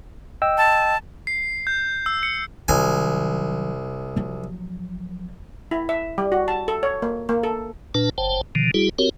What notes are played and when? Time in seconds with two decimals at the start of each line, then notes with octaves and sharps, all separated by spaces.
0.42 D#5 G5 E6
0.58 A5
1.27 C7
1.67 G6
2.06 E6
2.23 C#7
2.68 C2 D#3 F#3 G#5
4.16 F3 F#3
5.71 E4
5.89 E5
6.18 G3
6.32 F#4
6.48 A5
6.68 A4
6.83 C#5
7.02 A#3
7.29 A#3
7.43 A4
7.95 A#2 D4 B4 A5
8.18 F#1 C5 G5 A5
8.55 B2 D3 D#3 F3
8.74 G3 E4 F#4 G#4
8.99 C4 F#4 G4 A#4 C#5